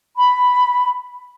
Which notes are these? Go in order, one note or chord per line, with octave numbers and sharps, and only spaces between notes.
B5